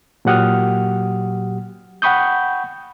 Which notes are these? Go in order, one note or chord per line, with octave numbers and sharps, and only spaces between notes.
A#2 F#3 G4 F#5 D#6 F6
F#5 G5 B5 C#6 D#6 G6